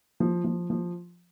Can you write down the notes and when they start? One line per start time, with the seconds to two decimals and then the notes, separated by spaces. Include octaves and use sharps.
0.20 F3
0.44 F3
0.70 F3